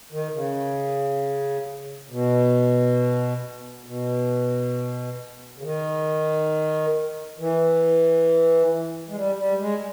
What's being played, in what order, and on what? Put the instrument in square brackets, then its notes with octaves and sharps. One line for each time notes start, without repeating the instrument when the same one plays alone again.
[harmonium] D#3
C#3
B2
B2
C#3
D#3
E3
G#3
G3
G3
G#3